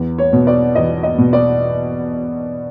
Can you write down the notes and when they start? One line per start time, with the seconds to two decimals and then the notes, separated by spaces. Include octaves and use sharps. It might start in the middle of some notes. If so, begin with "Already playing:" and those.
Already playing: E2
0.18 C#5
0.33 B2
0.47 D5
0.75 E2 D#5
1.03 D#5
1.18 B2
1.33 D5